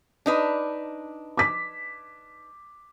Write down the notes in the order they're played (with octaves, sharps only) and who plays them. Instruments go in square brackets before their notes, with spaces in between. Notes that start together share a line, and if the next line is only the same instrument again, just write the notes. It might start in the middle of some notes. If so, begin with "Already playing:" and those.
[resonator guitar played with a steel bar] D4 D#4 B4
[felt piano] D6 B6